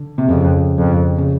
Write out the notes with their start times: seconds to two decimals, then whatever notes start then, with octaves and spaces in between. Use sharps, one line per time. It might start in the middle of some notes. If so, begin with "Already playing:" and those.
Already playing: D3
0.18 C3
0.28 F2 C#3
0.78 F2
1.18 C#3